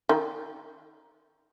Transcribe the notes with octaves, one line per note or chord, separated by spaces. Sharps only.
D#3